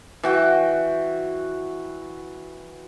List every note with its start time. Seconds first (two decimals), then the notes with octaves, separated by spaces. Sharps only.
0.23 E3 F#4 G5